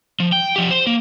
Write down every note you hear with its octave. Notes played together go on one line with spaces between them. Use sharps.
F3
G5
F3 G4
C5
A#3